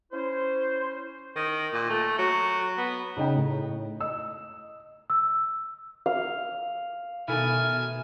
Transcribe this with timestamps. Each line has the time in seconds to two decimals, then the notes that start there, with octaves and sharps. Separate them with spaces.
0.13 C#4 E4 C5
1.36 D#3
1.73 A#2
1.89 A3
2.18 F#3
2.78 B3
3.17 C#3 D#4 D#5 G5 A#5
3.36 A2
4.00 D#5 E6
5.10 E6
6.06 F5
7.28 B2 D#3 A3 E4 G#5 F6